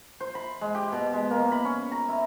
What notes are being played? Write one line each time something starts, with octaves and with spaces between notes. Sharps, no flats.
C5
B5
G#3
G4
B2
G#3
A#3
B5
C#4
A#5
E4